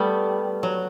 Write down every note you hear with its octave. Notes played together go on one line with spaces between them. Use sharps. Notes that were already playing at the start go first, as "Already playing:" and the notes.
Already playing: G3 A3 B3
F#3